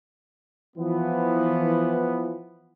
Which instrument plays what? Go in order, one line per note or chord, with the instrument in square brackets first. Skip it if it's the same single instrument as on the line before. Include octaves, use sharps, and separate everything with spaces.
[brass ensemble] E3 F3 B3